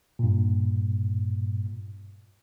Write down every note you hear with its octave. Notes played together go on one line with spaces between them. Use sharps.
G2 A#2